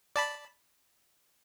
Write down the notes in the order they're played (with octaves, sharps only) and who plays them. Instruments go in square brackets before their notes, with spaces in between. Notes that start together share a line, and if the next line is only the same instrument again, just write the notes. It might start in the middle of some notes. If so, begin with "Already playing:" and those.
[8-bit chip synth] D5 A5 B5